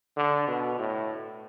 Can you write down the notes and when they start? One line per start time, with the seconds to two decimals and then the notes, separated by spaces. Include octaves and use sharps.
0.17 D3
0.48 B2
0.79 A2